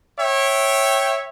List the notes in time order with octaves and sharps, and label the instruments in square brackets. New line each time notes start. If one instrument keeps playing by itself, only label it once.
[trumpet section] C#5 E5 G5